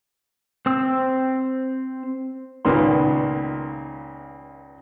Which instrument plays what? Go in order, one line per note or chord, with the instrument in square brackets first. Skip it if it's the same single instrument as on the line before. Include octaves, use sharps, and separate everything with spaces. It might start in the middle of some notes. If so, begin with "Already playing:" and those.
[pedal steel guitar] C4 E6
[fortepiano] C#2 A#2 D#3 B3 C6